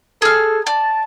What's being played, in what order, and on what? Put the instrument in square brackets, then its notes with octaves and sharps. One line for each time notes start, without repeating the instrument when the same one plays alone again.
[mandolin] G#4 F6 [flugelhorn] A4
[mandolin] D5 [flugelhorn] A5